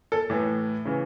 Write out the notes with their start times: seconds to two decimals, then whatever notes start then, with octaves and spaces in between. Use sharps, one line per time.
0.12 A4
0.30 A2 E3
0.85 C#3 E3